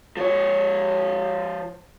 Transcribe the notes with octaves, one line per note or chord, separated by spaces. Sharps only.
F3 C#5